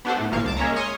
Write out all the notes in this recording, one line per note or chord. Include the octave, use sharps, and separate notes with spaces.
B3 D4 F#4 G4 A4 C5
A2 A3
G#1 A#2 F3 A#3 F5 C#6
C#2 A5 D6
G#3 A#3 C#4 C#5 E5 A#5
C#5 G#5 C6 C#6 D#6 F6